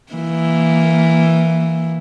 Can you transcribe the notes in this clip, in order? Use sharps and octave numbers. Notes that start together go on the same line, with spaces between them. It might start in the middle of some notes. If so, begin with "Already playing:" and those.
E3 A#3